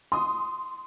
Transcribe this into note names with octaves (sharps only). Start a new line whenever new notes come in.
C6 D#6